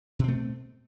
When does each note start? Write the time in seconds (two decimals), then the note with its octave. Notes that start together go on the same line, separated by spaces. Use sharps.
0.19 B2
0.24 C4
0.28 A3